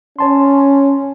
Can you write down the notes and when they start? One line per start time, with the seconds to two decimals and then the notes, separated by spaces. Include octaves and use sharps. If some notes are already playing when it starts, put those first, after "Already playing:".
0.19 C#4 C#5 A5 C6